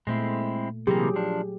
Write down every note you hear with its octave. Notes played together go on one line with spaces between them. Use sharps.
A#2 G#3 A3 C4 E4
C3 E3 F#3 A#3 G4 G#4
F3 D4